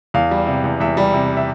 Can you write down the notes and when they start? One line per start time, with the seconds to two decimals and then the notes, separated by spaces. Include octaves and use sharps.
0.14 E2 F5
0.31 G3
0.47 C3
0.64 E2
0.80 E2 E5
0.97 G3
1.14 C3
1.37 E5